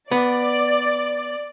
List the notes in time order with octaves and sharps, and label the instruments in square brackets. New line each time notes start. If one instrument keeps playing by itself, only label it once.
[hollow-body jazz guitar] B3 [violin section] D5